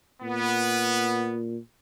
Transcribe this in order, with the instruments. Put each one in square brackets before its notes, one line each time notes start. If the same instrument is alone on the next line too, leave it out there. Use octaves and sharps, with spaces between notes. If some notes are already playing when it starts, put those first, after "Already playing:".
[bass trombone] A#2 [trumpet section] B3